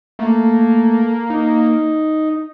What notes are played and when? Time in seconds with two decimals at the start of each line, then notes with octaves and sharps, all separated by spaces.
0.19 A3 A#3
1.30 D#4